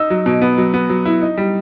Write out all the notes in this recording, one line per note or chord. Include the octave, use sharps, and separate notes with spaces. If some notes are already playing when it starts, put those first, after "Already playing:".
Already playing: D#4 E6
F#3
B2
B3
F#3
B3
F#3
E4
D#4
G3